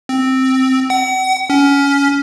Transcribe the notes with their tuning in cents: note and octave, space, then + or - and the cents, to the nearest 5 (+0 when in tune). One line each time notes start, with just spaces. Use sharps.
C4 +0
F#5 +40
C#4 +20